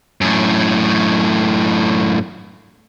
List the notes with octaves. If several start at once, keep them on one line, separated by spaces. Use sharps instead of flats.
F#2 A2